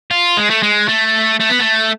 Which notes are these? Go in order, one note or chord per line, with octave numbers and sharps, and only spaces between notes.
F4
G#3
A3
G#3
A3
A3
B3
A3